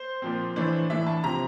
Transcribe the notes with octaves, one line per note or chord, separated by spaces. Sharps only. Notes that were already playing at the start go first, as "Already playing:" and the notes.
Already playing: C5
A#2 F3 C4
A2 E3 A3 D4
A2 E3 A3 D4 E5
A5
C3 F3 C4 A#5